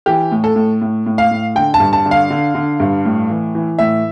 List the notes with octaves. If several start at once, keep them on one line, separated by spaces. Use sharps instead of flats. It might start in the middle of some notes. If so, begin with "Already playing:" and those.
E3 G4
A2
A4
A2
A2
A2
F5
A2
D3 G5
A5
G2
A5
D3
F5
D3
D3
G2
A2
E3
E3
A2 E5